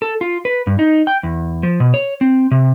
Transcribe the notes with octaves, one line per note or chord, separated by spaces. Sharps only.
A4
F4
B4
G2
D#4
G5
E2
F3
B2
C#5
C4
C3